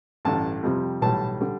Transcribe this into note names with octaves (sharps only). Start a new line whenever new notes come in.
A1 G2 D3 A5
F2 C3 G3
B1 A2 E3 G3 A5
D3 G3